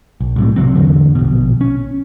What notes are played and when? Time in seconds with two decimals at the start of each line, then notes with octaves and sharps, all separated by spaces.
0.21 B1
0.36 C2 A2 C3
0.56 C3 D#3 F#3 C4
0.75 E2 A2 D3
1.15 A#1 B2
1.61 C#4